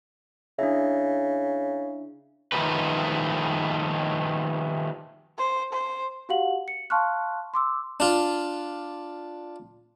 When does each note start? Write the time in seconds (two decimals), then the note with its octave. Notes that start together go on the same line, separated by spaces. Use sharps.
0.59 C#3 D4 E4 E5
2.52 D#3 F3 G3 A3 D#4 B4
5.38 C5
5.73 C5
6.29 F#4 G4 F5 F#5 F#7
6.68 C#7
6.90 F5 A5 C6 C#6 F6 F#6
7.54 C6 D6 E6
8.00 D4 F4